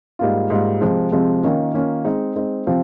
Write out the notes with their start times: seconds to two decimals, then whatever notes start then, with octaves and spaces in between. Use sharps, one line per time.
0.19 G#2 G3 A#3 F4
0.50 G#2 G3 A#3 F4
0.81 C3 F3 G#3 C4
1.12 C3 F3 G#3 C4
1.43 D#3 A#3 C#4 F4
1.74 D#3 A#3 C#4 F4
2.05 G#3 C4 D#4
2.36 G#3 C4 D#4
2.67 C3 F3 C4 F4